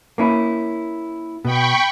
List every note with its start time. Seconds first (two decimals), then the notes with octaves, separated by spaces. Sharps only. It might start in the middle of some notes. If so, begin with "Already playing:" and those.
0.18 A#3 C#4 E4
1.45 B2 G5 B5 C#6